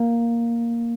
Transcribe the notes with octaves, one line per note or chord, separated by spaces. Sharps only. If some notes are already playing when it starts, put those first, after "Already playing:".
Already playing: A#3